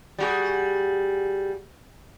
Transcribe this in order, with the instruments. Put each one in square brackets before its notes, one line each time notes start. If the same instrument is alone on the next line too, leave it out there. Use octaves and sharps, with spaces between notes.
[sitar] G3 F#4 G#4